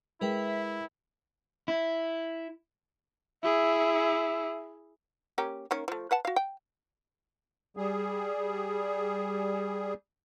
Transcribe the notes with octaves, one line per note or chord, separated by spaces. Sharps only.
G#3 E4 A#4 B4 E5 G5
E4
E4 G#4 E5
A#3 C#4 G4
D#3 A#3 C#4
F3 A3
B4 F#5 A5
F#4 F5
G5
G3 G#4